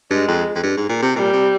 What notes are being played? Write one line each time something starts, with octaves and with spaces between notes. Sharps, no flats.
G2 G#3
F2
F2
G2
G#2
A#2
C3
A#2 G3
C3